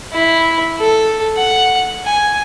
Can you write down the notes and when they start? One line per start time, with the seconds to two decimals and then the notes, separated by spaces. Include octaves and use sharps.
0.13 E4
0.78 A4
1.37 F#5
2.05 G#5